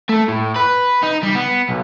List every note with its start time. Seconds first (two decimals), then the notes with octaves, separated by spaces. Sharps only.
0.09 A3
0.28 A2
0.56 B4
1.03 D#4
1.23 G3
1.35 B3
1.69 B1